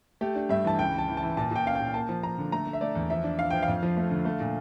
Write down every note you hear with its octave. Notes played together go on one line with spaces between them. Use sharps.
A3 G4
D4
G2 E5
E3 A5
C#2 G5
E3 A5
E3
A5
E3
A#2 A5
A#2 G5
C#4 F5
G5
A#2
A#3 A5
F3
F3 A#5
D3
A3 A#5
A3
E5
A3 D5
E2
F3 E5
D4
D4 F5
F3 G5
F5
F2
F3
A3
D3
A3
A#2